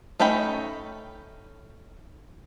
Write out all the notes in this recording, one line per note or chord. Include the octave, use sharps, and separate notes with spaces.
A3 C#4 D#4 G5 B5